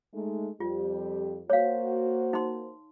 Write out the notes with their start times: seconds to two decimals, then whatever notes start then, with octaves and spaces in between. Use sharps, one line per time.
0.14 G#3 A3 D#4
0.60 F2 G3 F4 G4
1.50 A#3 F#4 C5 C#5 F5
2.33 D#4 C6